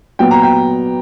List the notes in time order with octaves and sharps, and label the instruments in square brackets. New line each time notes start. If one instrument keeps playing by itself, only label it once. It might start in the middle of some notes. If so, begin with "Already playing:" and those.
[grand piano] A#2 F#3 B3 G5
A#5
G5